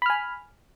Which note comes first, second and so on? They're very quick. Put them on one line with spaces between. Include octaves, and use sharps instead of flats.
B5 F6 G#5